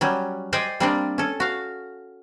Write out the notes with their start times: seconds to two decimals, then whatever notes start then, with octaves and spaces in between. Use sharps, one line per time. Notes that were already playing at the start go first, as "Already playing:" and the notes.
0.01 F#3 G3 C#4
0.53 C5 D5 D#5 G5 G#5
0.80 G3 A#3 C4 D4 G4 D5
1.18 C#4 A4
1.40 F#4 F5